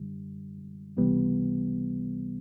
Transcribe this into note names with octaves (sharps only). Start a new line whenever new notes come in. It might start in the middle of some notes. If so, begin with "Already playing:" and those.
Already playing: F#2 D3 G3
C#2 C3 E3 G3 B3